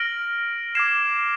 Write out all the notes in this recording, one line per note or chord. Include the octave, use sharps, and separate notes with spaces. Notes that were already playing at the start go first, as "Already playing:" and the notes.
Already playing: F6 A#6 D7 F#7
D6 F6 G#6 C7 E7